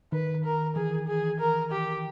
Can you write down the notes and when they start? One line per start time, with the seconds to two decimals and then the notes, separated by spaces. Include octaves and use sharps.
0.12 D#3 B4
0.44 A#4
0.76 E3 G#4
1.08 G#4
1.40 A#4
1.72 G4